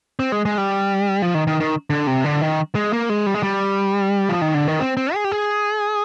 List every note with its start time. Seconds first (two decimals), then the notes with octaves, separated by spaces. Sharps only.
0.19 C4
0.32 G#3
0.45 G#3
0.58 G3
1.22 F3
1.35 D#3
1.47 D#3
1.60 D#3
1.90 D3
2.07 C3
2.24 D3
2.42 D#3
2.75 G#3
2.93 A#3
3.10 G#3
3.26 G3
3.34 G#3
3.43 G3
4.29 F3
4.41 D#3
4.54 D3
4.68 D#3
4.80 C4
4.97 C4
5.14 G#4
5.24 G4
5.32 G#4